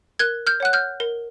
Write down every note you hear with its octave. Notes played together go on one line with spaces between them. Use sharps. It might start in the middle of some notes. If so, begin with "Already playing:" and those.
A#4 F#6 G#6
F6 G6
C#5 F#5 F#6
F6 G6
A#4